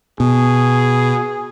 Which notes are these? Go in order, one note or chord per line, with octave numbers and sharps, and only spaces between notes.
B2 G#4